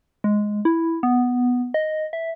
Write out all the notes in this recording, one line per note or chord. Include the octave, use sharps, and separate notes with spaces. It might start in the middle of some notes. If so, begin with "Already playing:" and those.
G#3
E4
B3
D#5
E5